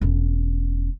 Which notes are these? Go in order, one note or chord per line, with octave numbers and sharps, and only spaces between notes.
E1 C#4